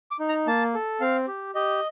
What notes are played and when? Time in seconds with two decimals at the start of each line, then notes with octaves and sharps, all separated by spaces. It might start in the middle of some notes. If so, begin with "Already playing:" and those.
0.11 D6
0.20 D#4
0.29 A#5
0.47 A#3 A5
0.74 A4
1.01 C4 F5
1.28 G4
1.55 G4 D#5